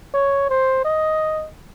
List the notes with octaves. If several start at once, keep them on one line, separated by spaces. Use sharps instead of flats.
C#5
C5
D#5